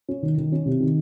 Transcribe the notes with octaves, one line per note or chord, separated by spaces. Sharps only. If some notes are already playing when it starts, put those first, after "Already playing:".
C#4
D#3
D#3
C#4
C3
D#3